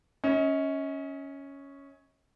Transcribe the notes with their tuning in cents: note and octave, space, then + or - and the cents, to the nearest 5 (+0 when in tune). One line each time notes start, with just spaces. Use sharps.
C#4 +0 D#5 +40